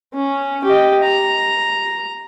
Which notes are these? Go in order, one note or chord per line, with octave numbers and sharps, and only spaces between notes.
C#4
G4 D#5
A#5